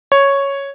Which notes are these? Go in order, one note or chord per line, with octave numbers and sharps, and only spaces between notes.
C#5